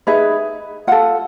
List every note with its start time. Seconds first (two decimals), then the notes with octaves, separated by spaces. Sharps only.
0.07 D#4 G#4 B4 E5
0.87 F4 A4 F#5